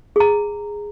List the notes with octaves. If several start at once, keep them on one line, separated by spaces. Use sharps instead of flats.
G#4 A#5